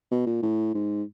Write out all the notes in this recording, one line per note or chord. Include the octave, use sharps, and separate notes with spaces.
B2
A#2
A2
G#2